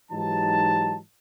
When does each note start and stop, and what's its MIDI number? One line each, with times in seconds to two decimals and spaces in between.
0.11 0.97 44
0.11 0.97 52
0.11 0.97 54
0.11 0.97 63
0.11 0.97 67
0.11 0.97 81